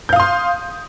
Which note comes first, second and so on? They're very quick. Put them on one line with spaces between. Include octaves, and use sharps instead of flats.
G6 F5 D#6 C6